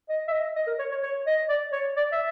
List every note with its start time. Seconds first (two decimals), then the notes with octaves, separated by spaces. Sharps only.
0.09 D#5
0.28 E5
0.32 D#5
0.56 D#5
0.67 A#4
0.79 C#5
0.91 C#5
1.03 C#5
1.27 D#5
1.49 D5
1.72 C#5
1.96 D5
2.12 E5